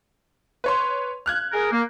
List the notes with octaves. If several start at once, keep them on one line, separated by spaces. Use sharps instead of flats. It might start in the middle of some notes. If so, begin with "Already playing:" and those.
B4 C#5 C6
F6 F#6 G#6
G#4 A#4
A#3